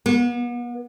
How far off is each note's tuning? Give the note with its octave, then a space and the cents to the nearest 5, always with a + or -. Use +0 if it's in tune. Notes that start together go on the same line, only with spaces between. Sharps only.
B3 -40